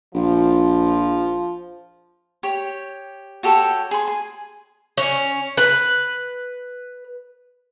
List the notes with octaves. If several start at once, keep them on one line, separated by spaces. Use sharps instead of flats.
A#1 F3
G4 C#5
F#4 G4 A4 C#5
G#4 C6
G#5
C#4
B4